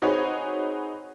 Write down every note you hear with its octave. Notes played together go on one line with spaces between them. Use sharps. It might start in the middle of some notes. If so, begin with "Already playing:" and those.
C4 D#4 F#4 G#4 B4 C#5